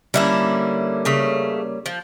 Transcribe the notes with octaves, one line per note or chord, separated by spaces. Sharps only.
D3 G3 A#3 C#4 E4
C#3 A3
F3